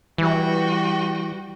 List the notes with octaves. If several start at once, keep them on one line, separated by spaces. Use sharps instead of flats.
E3 G3 F#4 G5